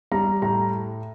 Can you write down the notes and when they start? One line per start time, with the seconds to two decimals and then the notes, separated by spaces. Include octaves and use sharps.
0.12 G3 A#5
0.42 A2 A#5